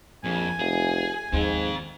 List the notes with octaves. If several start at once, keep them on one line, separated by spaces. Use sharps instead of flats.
A#1 F2 G#5
F1 G#4
D#2 G#2 C4 F4